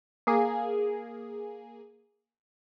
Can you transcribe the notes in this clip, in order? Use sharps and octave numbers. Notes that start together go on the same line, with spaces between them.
A#3 G#4